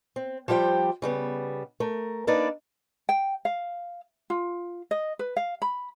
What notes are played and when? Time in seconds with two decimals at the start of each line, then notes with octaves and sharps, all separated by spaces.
0.16 C4
0.48 F3 G3 G4 C5 G5
1.02 C#3 G3 B3
1.80 A3 A#4
2.27 A#3 D4 D#4 B4 D5
3.09 G5
3.45 F5
4.30 F4
4.91 D#5
5.19 B4
5.37 F5
5.62 B5